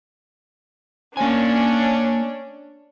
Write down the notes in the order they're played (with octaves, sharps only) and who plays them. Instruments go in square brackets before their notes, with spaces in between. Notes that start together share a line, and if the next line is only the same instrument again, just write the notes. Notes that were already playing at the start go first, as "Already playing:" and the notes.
[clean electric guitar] A#3 G#5 [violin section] C#4 D4